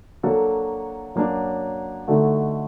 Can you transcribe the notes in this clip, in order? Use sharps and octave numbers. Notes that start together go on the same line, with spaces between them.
F#3 A#3 D4 F#4 A4
F#2 F#3 A#3 D4
D3 A3 D#4 F#4